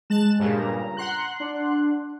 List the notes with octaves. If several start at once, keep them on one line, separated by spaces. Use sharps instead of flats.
G#3 A5 F#6 E7
G2 A#2 C#3
A#5
F#5 C6 F#6
D4